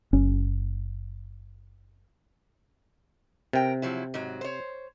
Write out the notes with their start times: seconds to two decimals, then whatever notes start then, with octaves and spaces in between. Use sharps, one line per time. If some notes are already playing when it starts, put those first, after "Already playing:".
0.13 F#1 C#4
3.53 C3 A#4 G5
3.82 F3 F#3 E4
4.14 G#2 F#3
4.41 C5 C#5